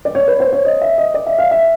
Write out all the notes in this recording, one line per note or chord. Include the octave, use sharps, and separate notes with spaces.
D5
C#5
B4
C5
C#5
D#5
E5
D#5
D5
E5
F5
E5